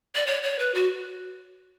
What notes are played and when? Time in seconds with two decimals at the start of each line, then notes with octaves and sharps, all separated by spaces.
0.15 D5
0.26 C#5
0.43 C#5
0.59 B4
0.74 F#4